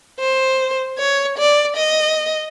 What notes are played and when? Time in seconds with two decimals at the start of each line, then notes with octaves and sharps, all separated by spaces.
0.19 C5
0.98 C#5
1.38 D5
1.76 D#5